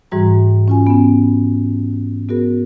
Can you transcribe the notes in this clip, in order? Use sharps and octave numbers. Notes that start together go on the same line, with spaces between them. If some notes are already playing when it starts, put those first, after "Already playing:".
G#2 E3 G3 F#4 A#5
C#4 F4 G#5
B3 C#4
B3 F#4 G#4 A#4